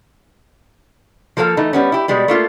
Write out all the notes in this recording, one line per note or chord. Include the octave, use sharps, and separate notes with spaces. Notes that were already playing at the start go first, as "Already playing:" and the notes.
F3 A#3 A4 A#4 F5
E3 A3 D#4
G3 B3 C#4
E4 G4
B2 G3 G#3
A3 A#3 F4